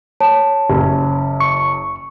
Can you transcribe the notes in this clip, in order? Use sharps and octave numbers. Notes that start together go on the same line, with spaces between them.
C#5 A5
F#1 C#4
C#6